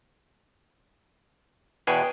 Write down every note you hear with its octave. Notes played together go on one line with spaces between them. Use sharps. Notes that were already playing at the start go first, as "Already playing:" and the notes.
E2 B2 G#4 B4 G5